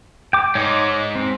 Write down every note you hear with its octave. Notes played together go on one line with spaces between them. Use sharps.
G5 D6
G#2 C#5 D#5 D6
C4